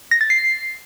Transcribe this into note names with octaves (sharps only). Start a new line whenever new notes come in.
A#6
A6
C7